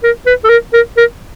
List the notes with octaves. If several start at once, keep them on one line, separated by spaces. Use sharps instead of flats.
A#4
B4
A4
A#4
A#4
A#4